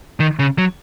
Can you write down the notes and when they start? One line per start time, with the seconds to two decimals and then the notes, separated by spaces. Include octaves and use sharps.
0.20 D#3
0.39 C#3
0.58 F#3